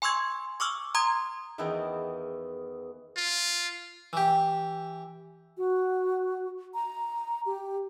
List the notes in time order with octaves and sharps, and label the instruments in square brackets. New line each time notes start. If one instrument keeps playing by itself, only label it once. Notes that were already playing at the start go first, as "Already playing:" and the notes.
[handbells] G#5 C6 C#6 E6 G#6
C#6 D6 E6 F6
A#5 C6 D#6 G#6
[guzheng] E2 D#3 E3 E4 G5
[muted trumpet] F4
[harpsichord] E3 G4
[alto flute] F#4
A#5
G4